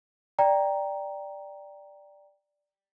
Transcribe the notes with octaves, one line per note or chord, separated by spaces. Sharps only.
D5 G5 A#5